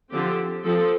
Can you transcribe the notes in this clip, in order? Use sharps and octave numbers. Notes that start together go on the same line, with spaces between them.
D3 F3 C4 G4
F3 C4 A4